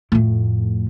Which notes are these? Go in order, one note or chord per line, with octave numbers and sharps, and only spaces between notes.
F2 A2